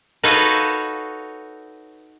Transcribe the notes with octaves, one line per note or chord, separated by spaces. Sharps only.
D#4 F#4 A4 B4 C#5 F5